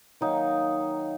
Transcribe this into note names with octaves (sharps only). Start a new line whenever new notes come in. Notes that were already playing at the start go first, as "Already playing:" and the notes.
D#3 F#3 A#3 D#4